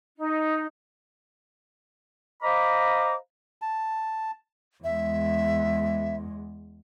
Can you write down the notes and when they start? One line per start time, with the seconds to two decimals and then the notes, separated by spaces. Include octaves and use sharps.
0.17 D#4
2.43 C5 D#5 F5 A#5 B5 D6
3.62 A5
4.84 E2 G#3 E5